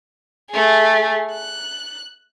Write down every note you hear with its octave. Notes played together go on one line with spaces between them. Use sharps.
A3 G#4
F#6